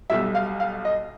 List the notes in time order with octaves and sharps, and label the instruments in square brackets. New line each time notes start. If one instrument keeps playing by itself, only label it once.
[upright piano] B1 B2 G3 E5
F5
F5
D#5